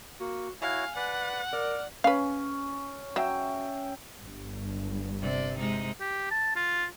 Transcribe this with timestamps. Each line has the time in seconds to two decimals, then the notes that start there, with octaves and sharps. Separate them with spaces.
0.20 A#3 F#4
0.62 E4 F#4 C#5 F5 G#5
0.96 B4 D5 F#5
1.53 A#4 D5 F6
2.04 C#4 B4 F5
3.16 F#3 E5 G5
4.20 G1 G2
5.22 C3 D5
5.59 C3 G#3 D#4
6.01 G4
6.31 A5
6.56 F4